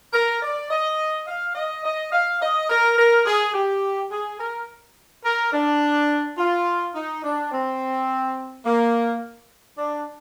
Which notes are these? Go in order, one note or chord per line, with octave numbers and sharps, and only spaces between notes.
A#4
D5
D#5
F5
D#5
D#5
F5
D#5
A#4
A#4
G#4
G4
G#4
A#4
A#4
D4
F4
D#4
D4
C4
A#3
D4